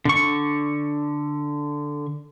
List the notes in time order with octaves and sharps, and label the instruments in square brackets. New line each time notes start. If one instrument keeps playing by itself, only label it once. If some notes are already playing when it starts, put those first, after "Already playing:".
[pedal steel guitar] D3 C#6